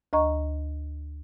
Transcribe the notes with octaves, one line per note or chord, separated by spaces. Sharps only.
D2 D#5 A#5 C#6